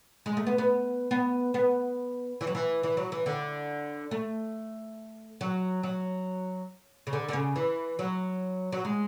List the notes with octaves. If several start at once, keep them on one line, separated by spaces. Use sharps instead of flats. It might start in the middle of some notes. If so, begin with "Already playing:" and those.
G#3
A3
B3
B3
B3
B3
E3
F#3
E3
E3
F#3
E3
D3
A3
F#3
F#3
C#3
D3
D3
C#3
E3
F#3
F#3
G#3